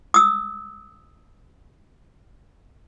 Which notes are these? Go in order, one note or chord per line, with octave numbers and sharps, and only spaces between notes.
D#6 E6